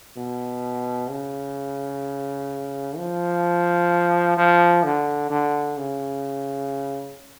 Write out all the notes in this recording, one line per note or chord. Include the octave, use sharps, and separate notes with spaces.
B2
C#3
F3
F3
D3
D3
C#3